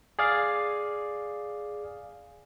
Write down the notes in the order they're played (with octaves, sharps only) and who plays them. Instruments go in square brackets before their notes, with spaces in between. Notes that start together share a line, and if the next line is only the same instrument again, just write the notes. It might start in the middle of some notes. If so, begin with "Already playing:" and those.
[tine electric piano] G#4 D5 F5